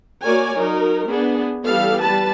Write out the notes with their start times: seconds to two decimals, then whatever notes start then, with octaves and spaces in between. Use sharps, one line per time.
0.24 A#3 F#4 A#4 C#5 D5 G#5
0.55 F#3 D#4 A#4
1.08 B3 D4 G#4
1.65 E3 G3 B3 G4 A4 F5
2.01 G3 B4 A5